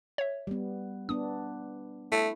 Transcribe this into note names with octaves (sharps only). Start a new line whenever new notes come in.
C#5 E5
G3 B3
B3 D4 D#6
A3 E4